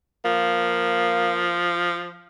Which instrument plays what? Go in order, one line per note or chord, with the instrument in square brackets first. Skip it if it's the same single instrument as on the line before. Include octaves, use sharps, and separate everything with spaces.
[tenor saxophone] F3 [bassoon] A#3